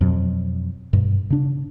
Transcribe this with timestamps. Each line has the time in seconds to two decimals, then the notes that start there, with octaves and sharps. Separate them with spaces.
0.01 F2 B2 F#3
0.93 G2 B2
1.30 C#3 D4